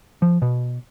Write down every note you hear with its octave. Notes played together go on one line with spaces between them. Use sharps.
F3
B2